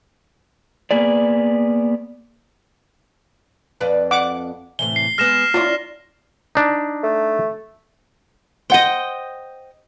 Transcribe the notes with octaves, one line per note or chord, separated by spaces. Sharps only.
A#3 B3 G#4 D5
F2 B4 D5
F#5 D6
A2 C3 E3 G7
C7
G#3 B3 F6 A#6 E7
C#4 D4 E4 F4
D4 D#4
A3
C5 D#5 F#5 G5